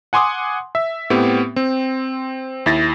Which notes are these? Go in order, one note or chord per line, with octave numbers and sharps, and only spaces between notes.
F#5 G#5 C6 D6 D#6
E5
A2 B3 C4 G4
C4
D#2 E4 A6 A#6